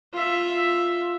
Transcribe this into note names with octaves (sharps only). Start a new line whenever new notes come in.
F4 E5